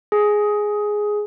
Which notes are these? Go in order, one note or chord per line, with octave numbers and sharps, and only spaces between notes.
G#4